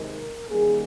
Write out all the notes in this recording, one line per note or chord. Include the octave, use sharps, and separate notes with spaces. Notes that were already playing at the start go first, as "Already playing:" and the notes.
Already playing: C3 D#3 G#3 D#4 A#4
D#3 G3 A#3 C#4 G#4